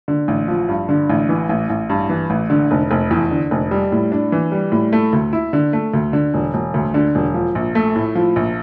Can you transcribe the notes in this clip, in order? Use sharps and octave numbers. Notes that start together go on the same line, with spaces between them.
D3
A1
F3
G2
D3
A1
E3
A1
A1
G2
E3
A1
D3
F1
F1
E2
D3
F1
G3
A2
D4
E3
G3
A2
A3
D2
E4
D3
A3
D2
D3
E1
E1
D2
D3
E1
F3
A#1
A3
A2
F3
A#1